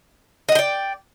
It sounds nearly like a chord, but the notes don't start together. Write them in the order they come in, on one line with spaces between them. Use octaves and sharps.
D#5 F#5 G5 D5